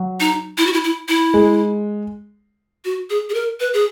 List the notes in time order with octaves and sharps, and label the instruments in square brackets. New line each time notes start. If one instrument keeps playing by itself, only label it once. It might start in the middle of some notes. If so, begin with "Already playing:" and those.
Already playing: [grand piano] F#3
[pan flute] D#4
E4
F#4
E4
E4
E4
[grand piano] G#3
[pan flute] F#4
G#4
G#4
A#4
B4
G#4